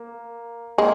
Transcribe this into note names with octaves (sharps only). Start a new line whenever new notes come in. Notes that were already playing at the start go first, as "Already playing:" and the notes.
Already playing: A#3
G#3 A#3